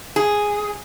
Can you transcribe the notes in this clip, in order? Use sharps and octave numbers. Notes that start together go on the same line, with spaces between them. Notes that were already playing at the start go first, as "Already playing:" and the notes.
G#4